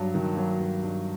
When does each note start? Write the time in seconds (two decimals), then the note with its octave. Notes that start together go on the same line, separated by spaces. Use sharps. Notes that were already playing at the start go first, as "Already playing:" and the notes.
Already playing: G2 F#3
0.14 D#3
0.37 F#3
0.59 G2
0.83 G2